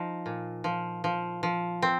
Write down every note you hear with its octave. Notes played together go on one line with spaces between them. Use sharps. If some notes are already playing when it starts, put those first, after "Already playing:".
Already playing: F3 D#4
A#2
F3
F3
F3
C4